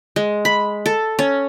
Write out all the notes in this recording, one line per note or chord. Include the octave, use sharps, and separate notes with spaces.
G#3
B5
A4
C#4